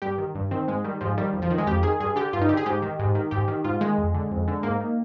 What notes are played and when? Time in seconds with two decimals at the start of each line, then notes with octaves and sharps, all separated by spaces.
0.02 G2 G4
0.18 D#3
0.35 G2
0.51 D#3 C4
0.68 G#2 G#3
0.84 D#3 G3
1.01 G#2 F3
1.17 D#3 G3
1.33 F2
1.42 F3
1.50 D#3
1.58 G#3
1.66 F2 G4
1.83 D#3 G#4
2.00 G2 G#4
2.16 D3 G4
2.33 G2 F4
2.41 D#4
2.49 D3 G4
2.57 G#4
2.66 G#2 G4
2.82 D#3
2.99 G#2
3.15 D#3
3.31 G#2 G4
3.48 D#3
3.64 G#2 F4
3.81 D#3 G#3
3.98 F2
4.14 D3
4.31 F2
4.48 D3
4.63 G#2 A#3
4.80 D#3